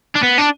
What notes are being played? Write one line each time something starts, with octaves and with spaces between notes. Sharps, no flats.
D4
B3
D4